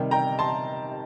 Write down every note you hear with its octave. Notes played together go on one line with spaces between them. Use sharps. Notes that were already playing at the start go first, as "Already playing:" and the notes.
Already playing: C3 D#3 G3
G5 A#5
A5 C6